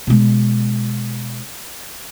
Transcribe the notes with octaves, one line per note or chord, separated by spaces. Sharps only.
B2 G#3